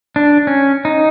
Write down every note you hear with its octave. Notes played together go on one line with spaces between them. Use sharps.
D4
C#4
D#4